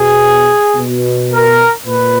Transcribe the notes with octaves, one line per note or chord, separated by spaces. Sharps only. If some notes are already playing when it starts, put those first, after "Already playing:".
Already playing: B2 G#4
B2
A#4
A#2 B4